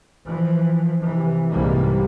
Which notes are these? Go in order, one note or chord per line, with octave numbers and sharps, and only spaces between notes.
E3 F3
C3 E3
C2 G#2 C3 E3 G3 A#3